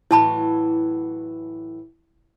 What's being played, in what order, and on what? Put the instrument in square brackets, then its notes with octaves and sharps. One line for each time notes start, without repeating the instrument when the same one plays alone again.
[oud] A2 E3 F#3 [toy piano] E4 A5 B5